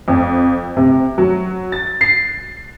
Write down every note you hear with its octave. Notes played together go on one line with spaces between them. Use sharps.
F2
C3
F#3
A6
C7